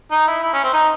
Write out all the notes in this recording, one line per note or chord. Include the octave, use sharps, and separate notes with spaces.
D#4
E4
E4
C#4
C4
D#4